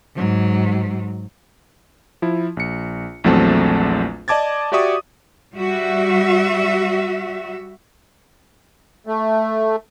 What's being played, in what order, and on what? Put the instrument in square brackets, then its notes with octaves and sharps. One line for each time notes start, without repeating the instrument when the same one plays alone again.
[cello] G#2 F#3
[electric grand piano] F3 E4
A#1 C#7
A#1 E2 F#3 A3 C4 A5
D5 D#5 A5 D6 G#6 A6
F#4 G4 D5 E5 C#6 D#6
[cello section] G3 F#4 E5
[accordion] A3